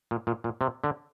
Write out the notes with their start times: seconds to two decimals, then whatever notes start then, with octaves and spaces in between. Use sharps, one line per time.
0.11 A#2
0.27 A#2
0.44 A#2
0.61 C3
0.84 D3